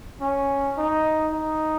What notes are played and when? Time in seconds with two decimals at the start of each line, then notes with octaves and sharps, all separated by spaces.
0.21 C#4
0.78 D#4
1.33 D#4